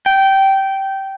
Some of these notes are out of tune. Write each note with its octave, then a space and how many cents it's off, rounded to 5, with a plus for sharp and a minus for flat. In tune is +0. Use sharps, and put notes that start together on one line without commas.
G5 -15